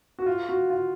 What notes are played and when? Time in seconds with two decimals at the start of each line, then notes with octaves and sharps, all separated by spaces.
0.19 F#4
0.26 F4
0.49 F#4
0.70 F4